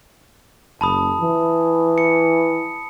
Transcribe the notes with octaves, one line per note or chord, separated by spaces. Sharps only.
F#1 A5 B5 D#6
E3
C#7